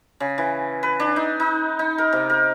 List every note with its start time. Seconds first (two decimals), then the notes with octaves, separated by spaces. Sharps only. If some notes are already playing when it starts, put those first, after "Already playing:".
0.20 C#3
0.38 E3
0.83 B4
1.00 D4
1.16 D#4
1.40 D#4
1.79 D#4
1.98 A#4
2.13 C3
2.30 A#4